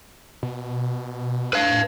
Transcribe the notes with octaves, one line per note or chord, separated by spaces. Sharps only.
B2
A2 B4 F5